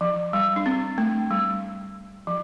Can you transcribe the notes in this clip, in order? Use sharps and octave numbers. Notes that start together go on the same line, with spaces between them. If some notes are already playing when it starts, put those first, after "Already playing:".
F3
G3
D4
C4
A3
G3
F3